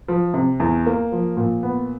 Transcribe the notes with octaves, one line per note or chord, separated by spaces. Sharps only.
F3
C3
E2
A#3
F3
A#2
B3